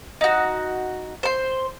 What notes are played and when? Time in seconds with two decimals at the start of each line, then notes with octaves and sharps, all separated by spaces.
0.21 D#4 F#4
1.23 C5 C6